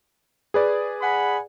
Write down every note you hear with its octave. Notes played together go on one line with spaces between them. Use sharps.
G#4 B4 D5
F#5 G#5 B5